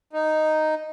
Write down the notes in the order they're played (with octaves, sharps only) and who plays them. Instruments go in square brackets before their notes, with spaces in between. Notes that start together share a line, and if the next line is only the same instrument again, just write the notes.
[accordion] D#4